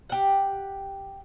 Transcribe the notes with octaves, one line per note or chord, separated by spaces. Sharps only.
G4 F#5